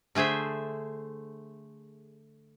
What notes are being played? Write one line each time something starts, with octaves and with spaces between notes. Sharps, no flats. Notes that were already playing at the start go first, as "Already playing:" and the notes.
D3 A3 G#4 C5 E5